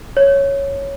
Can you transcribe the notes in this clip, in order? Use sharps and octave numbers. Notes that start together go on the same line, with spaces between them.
C#5